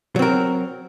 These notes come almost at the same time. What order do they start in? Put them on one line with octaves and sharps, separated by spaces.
F#3 C4 A#4